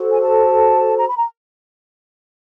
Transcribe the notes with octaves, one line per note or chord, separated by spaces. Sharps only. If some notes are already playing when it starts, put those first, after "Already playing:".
Already playing: F#4 A4 C5
G#5
A5
A#5
B5
A#5